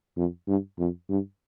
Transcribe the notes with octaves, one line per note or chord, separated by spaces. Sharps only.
F2
G2
F2
G2